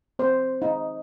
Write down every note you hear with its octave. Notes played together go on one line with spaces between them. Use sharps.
C4 C5
D#4